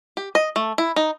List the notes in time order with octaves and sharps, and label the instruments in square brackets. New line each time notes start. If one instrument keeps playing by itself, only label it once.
[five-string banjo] G4
D#5
A3
E4
D#4